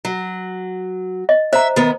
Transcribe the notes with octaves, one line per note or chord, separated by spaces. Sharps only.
F#3
D#5
C5 E5 A#5
D#3 B3